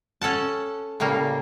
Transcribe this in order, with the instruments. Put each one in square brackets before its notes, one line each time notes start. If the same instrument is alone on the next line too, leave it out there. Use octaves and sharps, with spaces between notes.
[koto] C#4 A4 F#5 A5
A2 C#3 G3 A#3